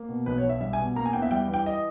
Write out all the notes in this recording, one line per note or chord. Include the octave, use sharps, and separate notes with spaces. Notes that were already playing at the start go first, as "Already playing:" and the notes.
Already playing: A#3
B2
B1 B4
C#5
B1
E5
G3 E5
G#5
B2
A#3 A#5
G#5
E2 G5
E5
G3 G5
E3
G5
D#5